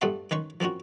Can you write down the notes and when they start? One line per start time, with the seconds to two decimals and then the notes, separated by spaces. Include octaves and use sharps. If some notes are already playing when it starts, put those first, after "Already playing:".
0.01 G2 G3 A3 B3 F#5 C6
0.31 D#3 C#4 B4 C6 C#6
0.60 F3 A#3 C4 C#4 F#4